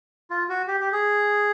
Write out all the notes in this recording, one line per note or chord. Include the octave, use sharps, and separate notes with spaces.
F4
F#4
G4
G4
G#4